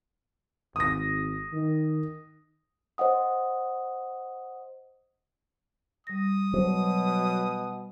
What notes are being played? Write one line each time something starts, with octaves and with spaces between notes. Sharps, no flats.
G#1 D#6 A#6
D#3
C5 D#5 F#5 D#6
G3 D#6 A#6
B2 F#3 C5